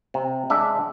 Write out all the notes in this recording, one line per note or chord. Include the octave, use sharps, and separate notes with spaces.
C3
G#3 D4 E5